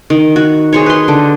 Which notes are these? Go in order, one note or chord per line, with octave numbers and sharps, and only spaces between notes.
D#3
F#4
G#4 C5 C#5
B4 C6
D3